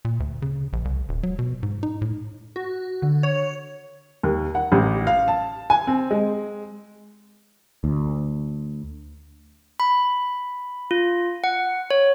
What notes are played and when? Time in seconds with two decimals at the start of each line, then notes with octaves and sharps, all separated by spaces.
0.05 A#2
0.20 D2
0.42 C#3
0.73 A#1
0.85 C2
1.09 D#1
1.23 F#3
1.39 B2
1.63 G#2
1.83 D#4
2.02 A2
2.56 F#4
3.02 D3
3.23 C#5
4.23 D#2
4.55 F#5
4.72 A1
5.07 F5
5.28 A5
5.70 G#5
5.87 C4
6.11 G#3
7.84 D2
9.80 B5
10.91 F4
11.44 F#5
11.91 C#5